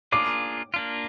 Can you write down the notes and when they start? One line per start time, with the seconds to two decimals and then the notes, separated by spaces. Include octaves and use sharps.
0.12 A#3 D4 F4 G#4 D6
0.74 A#3 D4 F4